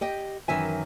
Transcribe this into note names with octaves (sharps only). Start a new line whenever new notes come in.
G4 D#5 G5
F#2 D#3 E3 E5 G#5